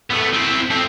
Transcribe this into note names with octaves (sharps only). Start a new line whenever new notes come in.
A3 B3
C4 E4
C4 A4